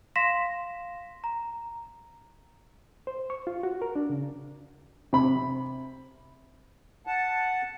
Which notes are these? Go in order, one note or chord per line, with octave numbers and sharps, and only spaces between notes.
F5 C6 A#6 B6 E7
A#5
C5
C#6
F4
F#4
A#4
D4
C#3
C3 B5
F#5 A5